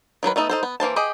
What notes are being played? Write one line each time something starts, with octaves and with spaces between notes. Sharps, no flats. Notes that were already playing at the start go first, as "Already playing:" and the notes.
D#3 F#3 A#4 B4
A3 B3 D#4 A4
D#4 A4 C5
B3
E3 A#3 C5 A5
G4 G#4 D#5